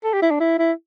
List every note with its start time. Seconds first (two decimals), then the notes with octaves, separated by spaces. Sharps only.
0.04 A4
0.13 G4
0.22 E4
0.31 D4
0.40 E4
0.58 E4